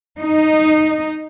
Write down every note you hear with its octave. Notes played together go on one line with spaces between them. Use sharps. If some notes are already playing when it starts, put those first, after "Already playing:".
D#4